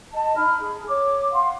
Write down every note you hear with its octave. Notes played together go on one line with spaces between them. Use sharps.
D#5 A5
D#4 B5 F6
G#4
C#5 D6
F5 F#5 C6